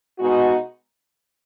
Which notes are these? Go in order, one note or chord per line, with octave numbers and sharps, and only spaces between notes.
B2 G#3 B3 D#4 F#4